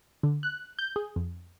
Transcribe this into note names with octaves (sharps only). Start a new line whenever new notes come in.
D3
F#6
G6
G#4
F2